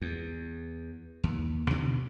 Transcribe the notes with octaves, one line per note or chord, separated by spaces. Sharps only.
E2
D#2
B2 D3 D#3